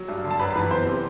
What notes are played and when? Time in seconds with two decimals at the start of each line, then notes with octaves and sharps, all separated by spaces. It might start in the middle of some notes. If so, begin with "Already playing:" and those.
Already playing: F#3
0.08 G2
0.24 D3
0.31 A5
0.39 F#2 B4 B5
0.51 A5
0.55 E3 B4 B5
0.71 E2 C5 C6
0.86 C3